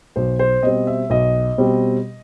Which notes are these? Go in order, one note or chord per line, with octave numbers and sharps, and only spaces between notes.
B1 C5
C5
B2 G3 C4 D#5
E5
B1 D#5
B2 G3 C4